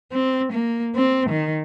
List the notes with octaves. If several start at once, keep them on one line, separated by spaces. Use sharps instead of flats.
C4
A#3
C4
D#3